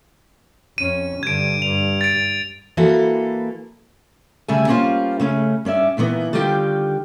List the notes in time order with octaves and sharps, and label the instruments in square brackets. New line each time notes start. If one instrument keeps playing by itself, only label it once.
[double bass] F2 C#4 [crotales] D#7
[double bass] G2 D3 [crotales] G#6 D7
[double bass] G2 [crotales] F7
[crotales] A6 D7
[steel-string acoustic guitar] E3 A#3 F#4 A4 B4
D2 C#3 G3 A3 E5 G#5
G3 A#3 B3 C#4 F4 C5
C#3 A3 C#4
G2 C#4 D5 E5
A#2 D#3 E3 B3
D3 D#3 G3 F4 G4 G5